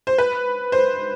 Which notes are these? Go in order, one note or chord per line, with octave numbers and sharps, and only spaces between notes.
C5
B4
C5